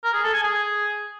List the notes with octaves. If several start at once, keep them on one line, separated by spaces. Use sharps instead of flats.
A#4
G#4
A4
G#5
G#4